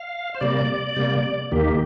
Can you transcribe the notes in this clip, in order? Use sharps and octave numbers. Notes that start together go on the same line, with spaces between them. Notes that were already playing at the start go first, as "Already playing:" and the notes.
Already playing: F5
C5
C3 G3 A#3 D5
C3 G3 A#3
D#2 D#3 A#3 G4